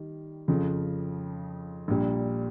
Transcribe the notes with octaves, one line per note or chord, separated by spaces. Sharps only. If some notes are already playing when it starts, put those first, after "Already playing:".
Already playing: D#3 G3
F2 C#3 F3
A#1 A#2 G3